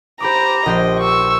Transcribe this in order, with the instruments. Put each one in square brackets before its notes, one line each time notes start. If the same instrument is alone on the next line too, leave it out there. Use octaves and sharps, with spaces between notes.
[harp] G4 B5 D6 [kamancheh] C5 A#5
[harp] A#1 G4 C6 [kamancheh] D#5
[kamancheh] C#6 E6